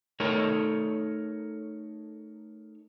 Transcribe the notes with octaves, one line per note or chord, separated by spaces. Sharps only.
A3 D#4 A4 A#4 C#5